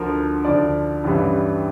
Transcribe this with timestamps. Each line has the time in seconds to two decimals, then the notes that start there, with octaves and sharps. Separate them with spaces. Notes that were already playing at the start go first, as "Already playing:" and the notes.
Already playing: D2 D3 F3 A#4
0.45 D2 D3 F3 D5
1.04 A1 G2 E3 G3